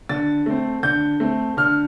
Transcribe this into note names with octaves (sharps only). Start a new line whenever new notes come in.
D3 A6
A3 C4
D3 G6
A3 C4
D3 F6